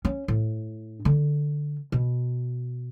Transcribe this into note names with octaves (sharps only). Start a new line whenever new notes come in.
C#4
A2
D3
B2